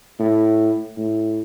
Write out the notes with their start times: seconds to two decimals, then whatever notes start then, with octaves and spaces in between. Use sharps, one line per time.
0.19 A2
0.97 A2